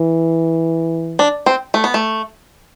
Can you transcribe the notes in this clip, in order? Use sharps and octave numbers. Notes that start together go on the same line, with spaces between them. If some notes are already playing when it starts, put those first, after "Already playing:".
Already playing: E3
D4
C4
A3
B3
A3